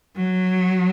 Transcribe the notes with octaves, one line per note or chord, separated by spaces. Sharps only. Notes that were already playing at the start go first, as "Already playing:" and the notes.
F#3